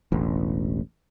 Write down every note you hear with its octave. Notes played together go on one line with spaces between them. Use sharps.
E1 A1